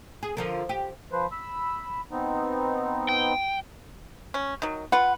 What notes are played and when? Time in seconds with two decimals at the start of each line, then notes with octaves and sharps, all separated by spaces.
0.23 G#4
0.37 D3 F3 A#4
0.69 G4
1.12 F3 B4 C5
1.32 B5 E6
2.11 B3 C4 D#4
3.09 G5
4.34 C#4
4.62 D#3 F#3
4.92 F4 B4 F#5